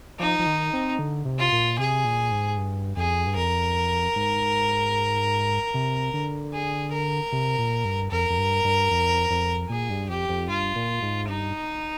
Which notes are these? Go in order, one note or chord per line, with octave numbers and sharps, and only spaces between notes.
F3 D#4
F3
D#3
C4
D3
C3
F4
A#2
C3 G#4
A#2
G#2
G2
F2 G#4
G2
F2 A#4
G#2
C3
D3
G#4
A#4
C3
A#2
G2
F2 A#4
F2
G2
G2
F2
F2
A#2 G#4
G2
F2 G4
F2
G2 F4
A#2
G#2
G2 D#4